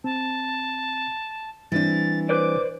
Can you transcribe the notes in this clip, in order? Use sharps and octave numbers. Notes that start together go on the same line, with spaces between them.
C4 A5
E3 G3 C4 D4 A6
B4 C5 D5 D6